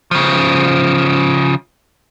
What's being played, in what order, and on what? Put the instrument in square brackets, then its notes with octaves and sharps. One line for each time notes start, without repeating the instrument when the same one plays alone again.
[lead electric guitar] C#3 F3